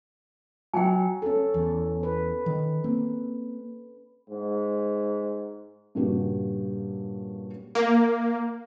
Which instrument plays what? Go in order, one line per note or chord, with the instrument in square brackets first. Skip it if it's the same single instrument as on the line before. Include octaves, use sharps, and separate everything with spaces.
[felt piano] F#3 [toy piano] G5 G#5
[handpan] C#4 A4
[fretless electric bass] E2
[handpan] B4
[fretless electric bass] D#3
A#3 C4
[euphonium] G#2
[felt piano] G2 A#2 C#3 F#4 G4
[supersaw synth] A#3